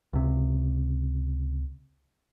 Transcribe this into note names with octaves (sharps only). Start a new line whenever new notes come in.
C#2 C3